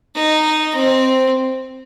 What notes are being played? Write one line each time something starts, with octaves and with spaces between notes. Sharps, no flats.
D#4
C4